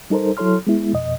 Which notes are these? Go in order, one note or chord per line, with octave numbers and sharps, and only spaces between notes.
G3 D#4 A4 A#4 C5
F#3 E4 A4 C#5 C6 F6
G#3 B3 E4
F2 B2 D#5